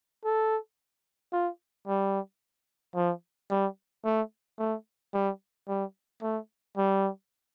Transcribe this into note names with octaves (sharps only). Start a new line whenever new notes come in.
A4
F4
G3
F3
G3
A3
A3
G3
G3
A3
G3